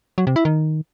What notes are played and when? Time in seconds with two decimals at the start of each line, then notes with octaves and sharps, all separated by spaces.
0.18 F#3
0.27 C3
0.36 E4
0.45 D#3